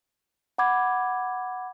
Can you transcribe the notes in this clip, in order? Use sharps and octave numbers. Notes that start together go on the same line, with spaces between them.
F#5 B5 D6 G#6